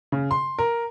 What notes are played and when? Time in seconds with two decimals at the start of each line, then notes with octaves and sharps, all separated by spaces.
0.12 C#3
0.31 C6
0.59 A#4